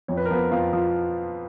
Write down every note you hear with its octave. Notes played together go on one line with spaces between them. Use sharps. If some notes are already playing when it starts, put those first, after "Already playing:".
F2 C#5
B4
A#4
F3 B3 B4
F2 F4 F5
F3